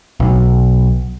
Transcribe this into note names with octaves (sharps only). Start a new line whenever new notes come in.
B1